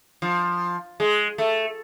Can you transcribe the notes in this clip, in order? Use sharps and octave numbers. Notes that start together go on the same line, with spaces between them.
F3
G#3
A3